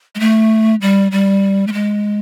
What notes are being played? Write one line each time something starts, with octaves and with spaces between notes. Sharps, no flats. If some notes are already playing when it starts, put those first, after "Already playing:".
G#3
A3
G3
G3
A3
G#3